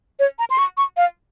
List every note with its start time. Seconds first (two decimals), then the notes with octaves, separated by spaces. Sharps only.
0.19 C#5
0.39 A#5
0.50 C6
0.58 C#6
0.77 C#6
0.97 F5